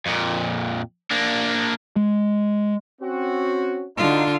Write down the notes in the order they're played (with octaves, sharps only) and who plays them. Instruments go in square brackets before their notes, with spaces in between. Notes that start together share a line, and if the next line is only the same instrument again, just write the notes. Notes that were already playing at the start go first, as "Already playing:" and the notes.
[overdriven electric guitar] F2 A#2
A#3 D4
[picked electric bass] G#3
[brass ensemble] C4 C#4 F#4
[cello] D3 F4 [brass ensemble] D#4 F#4